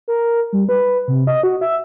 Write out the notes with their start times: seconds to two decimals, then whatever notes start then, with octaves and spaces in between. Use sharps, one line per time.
0.08 A#4
0.53 G3
0.69 B4
1.08 C3
1.27 D#5
1.43 F#4
1.61 E5